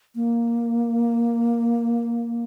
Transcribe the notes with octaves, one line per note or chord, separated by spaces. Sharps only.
A#3